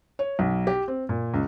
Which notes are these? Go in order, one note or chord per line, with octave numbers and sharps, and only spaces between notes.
C#5
B1
G4
C4
A#2
C#2